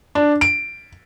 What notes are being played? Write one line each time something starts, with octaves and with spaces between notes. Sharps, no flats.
D4
D7